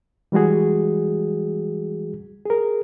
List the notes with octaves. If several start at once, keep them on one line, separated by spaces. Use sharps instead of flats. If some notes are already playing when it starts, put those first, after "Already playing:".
E3 G3 G#3 F#4 G#4
G#4 A#4